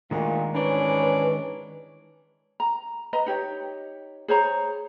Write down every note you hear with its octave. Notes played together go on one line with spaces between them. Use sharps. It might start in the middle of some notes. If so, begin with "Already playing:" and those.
D2 A#2 D#3 G#3
G#2 E3 C#4 D4 B4
A#5
B4 D#5 A#5
D#4 G4 C#5
G#4 C5 C#5 A#5